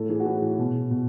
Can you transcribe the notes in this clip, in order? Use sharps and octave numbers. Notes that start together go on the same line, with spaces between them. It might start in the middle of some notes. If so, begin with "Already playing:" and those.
Already playing: A2 A4
E3 G#4
F#4
A2 G#4
E3
B2
B2